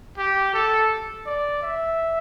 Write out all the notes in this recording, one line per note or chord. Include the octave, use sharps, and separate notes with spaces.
G4
A4
D5
E5